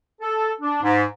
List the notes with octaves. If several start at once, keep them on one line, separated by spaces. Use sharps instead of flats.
A4
D4
G#2